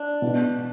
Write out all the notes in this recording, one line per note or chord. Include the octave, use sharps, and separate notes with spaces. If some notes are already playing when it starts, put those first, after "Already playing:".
Already playing: D4
B2